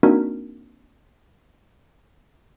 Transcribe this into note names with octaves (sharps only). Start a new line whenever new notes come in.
A#3 C4 D4 D#4 F#4 A#4